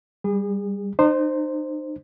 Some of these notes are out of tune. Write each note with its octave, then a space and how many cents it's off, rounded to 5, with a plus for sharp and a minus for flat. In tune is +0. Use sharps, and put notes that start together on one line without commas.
G3 +10 G#4 -30
D#4 -40 C5 +0